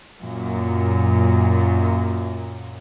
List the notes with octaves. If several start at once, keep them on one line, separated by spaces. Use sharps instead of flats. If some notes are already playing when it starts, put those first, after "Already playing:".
F#2 A#2